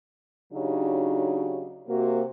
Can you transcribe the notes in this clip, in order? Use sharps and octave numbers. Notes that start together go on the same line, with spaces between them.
C#3 F#3 D4 D#4 F#4 G4
C3 A#3 F#4